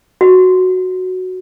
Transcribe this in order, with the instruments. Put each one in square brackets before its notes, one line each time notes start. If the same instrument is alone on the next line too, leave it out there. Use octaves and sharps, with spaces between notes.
[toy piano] F#4